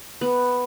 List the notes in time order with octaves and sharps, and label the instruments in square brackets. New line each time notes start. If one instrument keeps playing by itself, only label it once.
[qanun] B3